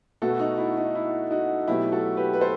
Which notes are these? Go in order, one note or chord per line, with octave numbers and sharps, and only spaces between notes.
B2 A3 F#4 A4
D#4 F#4
E4
D#4
E4
D#4 F#4
B2 F#3 A3 E4 G4
F#4 A4
G4 B4
B4
A4 C5